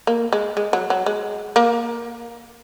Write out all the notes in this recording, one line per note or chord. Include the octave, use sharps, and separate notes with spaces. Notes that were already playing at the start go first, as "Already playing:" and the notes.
A#3
G#3
G#3
F#3
F#3
G#3
A#3